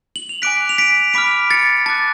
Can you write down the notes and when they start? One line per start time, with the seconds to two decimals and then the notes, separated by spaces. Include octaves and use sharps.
0.16 F#7
0.29 F7
0.42 G#5 D6 F#6 B6 D7
0.69 F7
0.78 B6 D7
1.14 B5 D6 F6 B6 D7
1.51 A6 C#7
1.86 A5 D6 F#6 A6